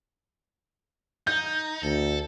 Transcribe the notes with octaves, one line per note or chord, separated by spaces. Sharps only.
D#4 G6
D2 A4